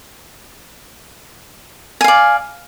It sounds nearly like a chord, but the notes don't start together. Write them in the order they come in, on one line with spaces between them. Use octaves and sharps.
G#5 F5 D5